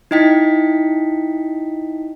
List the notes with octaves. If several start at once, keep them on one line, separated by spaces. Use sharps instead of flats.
D#4 E4 D#5 G5 B6